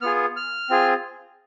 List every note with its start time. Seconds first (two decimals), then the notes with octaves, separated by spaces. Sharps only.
0.01 B3 F4 G#4 F6
0.36 F6
0.70 C4 F4 G#4